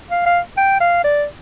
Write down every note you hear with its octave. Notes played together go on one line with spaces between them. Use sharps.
F5
F5
G5
F5
D5